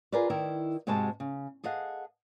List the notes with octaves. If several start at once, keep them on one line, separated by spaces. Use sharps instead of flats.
F4 G#4 A#4 B4 D5
D#3 E4 A#4
G#2 C3 G#3 F#4 C5 A5
C#3
G#4 A4 D#5 F5 F#5